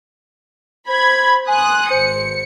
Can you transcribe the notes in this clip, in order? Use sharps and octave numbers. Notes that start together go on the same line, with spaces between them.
C5 B5 G#6
G#5 C6 D#6 F#6
G#1 C5 C#7